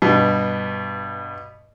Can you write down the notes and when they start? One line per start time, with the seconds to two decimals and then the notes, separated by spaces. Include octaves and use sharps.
0.02 G2 B2